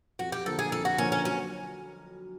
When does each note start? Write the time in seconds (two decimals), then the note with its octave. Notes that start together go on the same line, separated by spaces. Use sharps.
0.19 F2 F#4
0.32 G4
0.45 D3 F3 A#3 A4
0.59 G#4
0.72 F2 A4
0.85 F#4
0.98 D3 F3 A#3 C#4
1.12 C#4
1.25 F#3 C#4